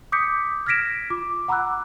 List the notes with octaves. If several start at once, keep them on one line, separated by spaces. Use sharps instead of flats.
D6 D#6 G6 B6 C#7
F6 G#6 A#6 B6 D7 E7
F4 D6
F#5 A#5 B5 D6 E6 F#6